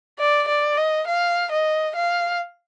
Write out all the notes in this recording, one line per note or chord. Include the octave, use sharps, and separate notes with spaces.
D5
D5
D#5
F5
D#5
F5